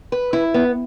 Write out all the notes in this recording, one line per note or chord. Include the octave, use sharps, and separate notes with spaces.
B4
E4
B3